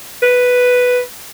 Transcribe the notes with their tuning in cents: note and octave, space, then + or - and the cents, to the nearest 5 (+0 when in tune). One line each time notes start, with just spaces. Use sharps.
B4 +0